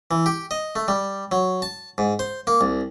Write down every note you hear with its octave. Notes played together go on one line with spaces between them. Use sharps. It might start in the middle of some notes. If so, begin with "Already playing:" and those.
E3
G4
D#5
A3
G3
F#3
A5
G#2
C5
A#3
C2